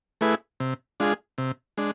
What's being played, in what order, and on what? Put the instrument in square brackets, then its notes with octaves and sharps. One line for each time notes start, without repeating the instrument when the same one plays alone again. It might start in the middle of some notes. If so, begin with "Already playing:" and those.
[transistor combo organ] A3 E4 G#4 B4
C3
G#3 D4 F4 G#4
C3
G#3 D4